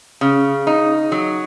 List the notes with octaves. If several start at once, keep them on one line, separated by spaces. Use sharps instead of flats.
C#3
D#4
F#3